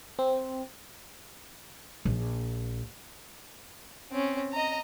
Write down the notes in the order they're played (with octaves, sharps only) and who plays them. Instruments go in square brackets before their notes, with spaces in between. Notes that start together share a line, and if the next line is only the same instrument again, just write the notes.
[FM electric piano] C4
[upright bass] A#1
[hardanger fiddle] C4 C#4
D#5 A#5